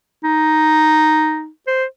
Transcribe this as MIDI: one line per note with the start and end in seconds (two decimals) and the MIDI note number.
0.23 1.48 63
1.67 1.84 72